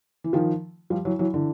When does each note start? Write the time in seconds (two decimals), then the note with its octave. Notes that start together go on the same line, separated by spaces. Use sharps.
0.24 E3
0.33 D#3 F3
0.90 F3 G3
1.05 E3 F#3
1.19 E3 F#3
1.34 D3 E3